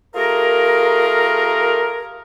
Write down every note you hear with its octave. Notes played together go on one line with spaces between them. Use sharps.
A3 F4 G4 G#4 A#4